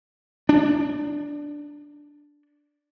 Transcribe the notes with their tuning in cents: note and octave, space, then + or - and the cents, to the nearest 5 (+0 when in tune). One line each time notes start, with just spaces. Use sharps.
D4 +0